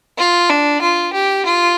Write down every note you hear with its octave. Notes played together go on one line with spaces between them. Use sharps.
F4
D4
F4
G4
F4